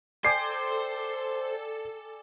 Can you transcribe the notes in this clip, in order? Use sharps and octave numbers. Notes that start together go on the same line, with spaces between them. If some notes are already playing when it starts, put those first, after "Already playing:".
A4 C5 D5 G5 G#5 C7